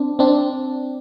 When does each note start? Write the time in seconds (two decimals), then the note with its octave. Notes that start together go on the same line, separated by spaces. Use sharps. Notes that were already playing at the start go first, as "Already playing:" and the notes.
Already playing: C4 D4
0.19 C4 D4